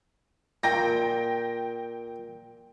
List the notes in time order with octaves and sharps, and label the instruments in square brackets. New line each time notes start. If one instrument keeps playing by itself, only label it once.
[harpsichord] A#2 [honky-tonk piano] G5 A#6